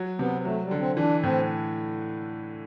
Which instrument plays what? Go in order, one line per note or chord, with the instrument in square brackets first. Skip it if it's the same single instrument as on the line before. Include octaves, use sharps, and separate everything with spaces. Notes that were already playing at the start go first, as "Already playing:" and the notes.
Already playing: [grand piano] F#3
[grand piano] C3 [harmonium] B3
[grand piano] F#3 [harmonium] A3
[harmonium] G3
[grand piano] D3
[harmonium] C4
[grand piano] E3 [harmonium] D4
[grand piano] A2 [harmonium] C4